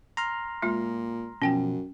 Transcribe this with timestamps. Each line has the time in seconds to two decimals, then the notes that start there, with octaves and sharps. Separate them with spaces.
0.17 A#5 C6 F6
0.62 A#2 G#3 F4
1.42 F#2 B2 F3 C#4 G5 G#5